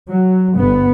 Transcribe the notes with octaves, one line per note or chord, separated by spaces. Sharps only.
F#3
G1 B3